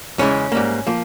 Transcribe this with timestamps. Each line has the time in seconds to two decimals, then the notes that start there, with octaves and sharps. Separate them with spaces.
0.18 E2 C#3 E3 G#3 C#4
0.52 G#2 G3 A#3
0.87 F3 A#3